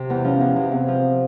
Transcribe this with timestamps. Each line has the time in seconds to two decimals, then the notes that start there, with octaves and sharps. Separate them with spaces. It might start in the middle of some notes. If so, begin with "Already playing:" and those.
Already playing: C3
0.10 E2
0.24 F3 C#4
0.40 E2
0.56 C3
0.72 E2 C4
0.88 F3